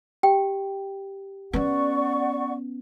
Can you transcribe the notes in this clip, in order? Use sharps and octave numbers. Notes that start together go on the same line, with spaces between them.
G4 G5
B3 C#4 D5 F#5 C#6